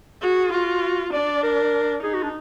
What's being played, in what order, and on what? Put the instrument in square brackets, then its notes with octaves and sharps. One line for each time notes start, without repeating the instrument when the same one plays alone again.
[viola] F#4 [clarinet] G#4
[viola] F4 [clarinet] F#4
[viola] D4 [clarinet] D5
[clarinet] A#4
[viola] D#4 [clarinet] G#4
[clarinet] F#4
D4